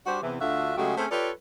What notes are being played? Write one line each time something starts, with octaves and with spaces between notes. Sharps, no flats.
G3 D4 F#4 G4 C5 F#5
E2 C3 E3
D2 D3 F4 F#4 E5
C#3 F#3 G#3 A3 F#4 G4
A3 C4 C#4 G#4 C5
F4 G4 A4 B4 C#5 D5